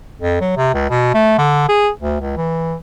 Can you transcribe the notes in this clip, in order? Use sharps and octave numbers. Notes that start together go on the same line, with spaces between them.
F2
F#3
C3
C#2
B2
A3
D3
G#4
D2
C#2
E3